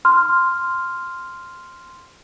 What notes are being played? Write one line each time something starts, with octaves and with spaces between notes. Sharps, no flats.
C6 F6